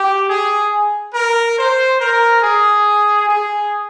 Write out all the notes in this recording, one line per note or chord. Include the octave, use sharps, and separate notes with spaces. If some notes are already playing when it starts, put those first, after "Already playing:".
Already playing: G4
G#4
A#4
C5
A#4
G#4
G#4